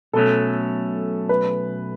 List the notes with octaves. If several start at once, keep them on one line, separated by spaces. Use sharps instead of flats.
B1 B2 F#3 A3 C#4 A4
B4